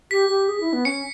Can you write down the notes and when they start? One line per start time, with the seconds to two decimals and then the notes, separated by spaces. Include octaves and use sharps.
0.11 G4 B6
0.29 G4
0.48 G#4
0.60 E4
0.73 B3
0.85 C#4 C#7